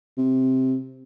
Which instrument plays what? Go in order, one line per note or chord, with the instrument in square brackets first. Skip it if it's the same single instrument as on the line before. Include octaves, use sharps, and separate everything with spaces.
[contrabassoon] C3